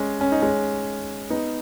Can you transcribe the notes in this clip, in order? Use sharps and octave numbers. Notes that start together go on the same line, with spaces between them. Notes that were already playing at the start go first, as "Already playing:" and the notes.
Already playing: G#3 C#4
C#4
D#4
G#3 C#4
B3 D#4